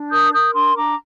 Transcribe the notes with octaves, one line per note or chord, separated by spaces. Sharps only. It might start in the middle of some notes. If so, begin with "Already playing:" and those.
Already playing: D4
A#4 D#6 G6
A#4 D#6 G6
D4 C6 D#6
D4 A#5 D6